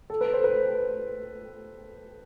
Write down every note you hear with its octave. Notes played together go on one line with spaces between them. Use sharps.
A4
B4
C5
B4